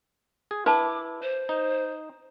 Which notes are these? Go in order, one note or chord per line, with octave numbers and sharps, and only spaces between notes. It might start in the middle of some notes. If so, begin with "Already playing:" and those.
G#4
E4 B4 A5 D6
C5
D#4